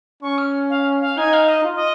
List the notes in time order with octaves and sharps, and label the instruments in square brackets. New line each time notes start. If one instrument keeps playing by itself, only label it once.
[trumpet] C#4 [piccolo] C#6
[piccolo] F6
F5
F5
[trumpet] D#4 [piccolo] G#5
[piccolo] F5
D#5
[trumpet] F4
[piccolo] D#5